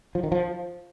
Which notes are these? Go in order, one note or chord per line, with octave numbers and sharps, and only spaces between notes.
F3
D#3
F3